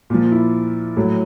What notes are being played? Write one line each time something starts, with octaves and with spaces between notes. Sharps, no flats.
A#2 F3
E4
A2 F#3